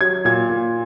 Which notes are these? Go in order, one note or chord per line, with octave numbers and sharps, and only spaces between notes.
F#3 G#6
A#2 G#6
A#2